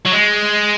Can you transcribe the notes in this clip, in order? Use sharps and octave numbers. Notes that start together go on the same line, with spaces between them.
F#3
G#3